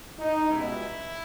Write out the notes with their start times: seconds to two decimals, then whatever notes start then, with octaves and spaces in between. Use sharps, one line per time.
0.18 D#4
0.50 C#2 B2 G3 E4